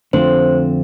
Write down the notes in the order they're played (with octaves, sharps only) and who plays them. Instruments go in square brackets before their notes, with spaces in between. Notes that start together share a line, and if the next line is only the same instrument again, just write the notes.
[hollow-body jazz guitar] F2 D3 A3 C4 F4 [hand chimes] C5